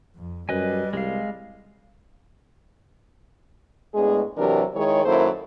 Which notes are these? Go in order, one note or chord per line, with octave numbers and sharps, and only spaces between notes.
F2
F#2 G3 B4 D#5 G#5
C2 G#3 F5
A2 G#3 B3 D4 G#4
C3 E3 F#3 D4 G4 A#4
D#3 G#3 E4 G#4 C#5
F#2 D#3 A#3 E4 A4 C5